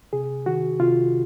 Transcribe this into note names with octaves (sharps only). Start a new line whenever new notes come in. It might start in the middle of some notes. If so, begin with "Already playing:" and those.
C3 G#4
D#3 F#4
C3 F4